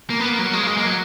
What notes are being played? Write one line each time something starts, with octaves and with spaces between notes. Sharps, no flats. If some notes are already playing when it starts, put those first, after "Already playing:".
A#3
B3
A#3
F#3
G#3
A#3
G#3
A#3
F#3